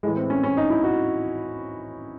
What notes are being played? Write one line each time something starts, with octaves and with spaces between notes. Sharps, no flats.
A2 E3 G#3
C4
C#4
C#4
D#4
E4
F#4